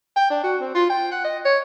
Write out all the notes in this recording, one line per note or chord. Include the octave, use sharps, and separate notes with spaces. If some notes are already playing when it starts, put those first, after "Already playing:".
G5
D4
F#4
C4
F4
G5
F#5
D#5
C#5